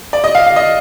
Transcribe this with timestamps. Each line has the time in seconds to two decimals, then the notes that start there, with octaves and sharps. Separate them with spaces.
0.13 D5
0.24 D#5
0.35 F5
0.46 F5
0.56 D#5